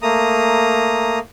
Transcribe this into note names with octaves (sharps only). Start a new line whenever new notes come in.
A3 A#3 A#5 D#6